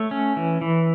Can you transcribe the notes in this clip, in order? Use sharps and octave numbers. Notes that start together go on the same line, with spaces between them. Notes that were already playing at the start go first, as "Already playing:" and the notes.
Already playing: A3 C#5
C#4
E3
E3